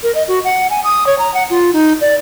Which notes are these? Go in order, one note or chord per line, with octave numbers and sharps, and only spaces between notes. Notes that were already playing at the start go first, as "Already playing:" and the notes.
A#4
D#5
F#4
F#5
G#5
D#6
C#5
A#5
F#5
F4
D#4
D5